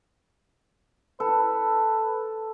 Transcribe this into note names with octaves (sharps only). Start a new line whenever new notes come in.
A4 B4